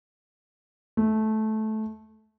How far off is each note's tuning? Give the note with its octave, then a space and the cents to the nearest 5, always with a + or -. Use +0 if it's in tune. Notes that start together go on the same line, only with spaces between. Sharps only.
A3 -15